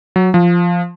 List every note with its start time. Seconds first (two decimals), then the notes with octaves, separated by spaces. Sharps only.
0.16 F#3
0.34 F3